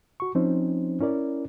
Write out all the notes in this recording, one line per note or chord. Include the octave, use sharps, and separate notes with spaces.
F#4 C#6
F3 C4 C#4 D#4 C5
C#4 E4 A#4 D5